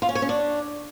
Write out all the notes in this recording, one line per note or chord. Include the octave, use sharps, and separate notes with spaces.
F4
C#4
C#5
C#4
D4